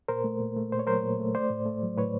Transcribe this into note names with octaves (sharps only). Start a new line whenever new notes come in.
A#2 A#4 C5
A3
A#2
A3
A#2 C5
C#5
F#3 A#4 C5
A#2
A3
A3 C5 D5
A2
A3
F#3
A2 B4 C#5